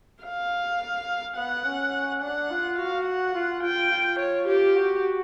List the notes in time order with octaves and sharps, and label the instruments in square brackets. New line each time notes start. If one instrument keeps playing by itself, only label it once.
[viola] F5
[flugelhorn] B3 [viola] F#5
[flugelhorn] C#4
[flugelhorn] D4 [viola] F#5
[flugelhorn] F4
[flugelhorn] F#4 [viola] F5
[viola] F#5
[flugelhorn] F4
[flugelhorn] F4 [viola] G5
[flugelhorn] F4
[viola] C#5
G4
[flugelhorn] F#4